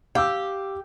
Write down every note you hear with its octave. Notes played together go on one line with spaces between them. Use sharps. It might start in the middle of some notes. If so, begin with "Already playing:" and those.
G4 F5 D6 E6